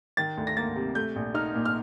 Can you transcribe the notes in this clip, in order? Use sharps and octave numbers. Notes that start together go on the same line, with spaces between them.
D#3 A6
D2
A#6
A#3 A6
C3
A3 G6
A#1
D#4 F6
A#2
F6